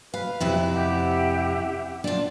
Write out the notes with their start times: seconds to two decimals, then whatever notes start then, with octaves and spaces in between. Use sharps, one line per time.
0.14 B4 F5
0.40 F2 C3 E4
0.74 G4 E5 F#5
2.04 D4 F4